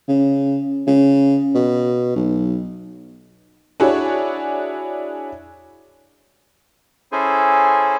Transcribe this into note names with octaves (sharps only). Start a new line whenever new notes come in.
C#3
C#3
B2
B1
D4 E4 F#4 G#4 C#5
C#4 E4 G#4 A4 C5 G#5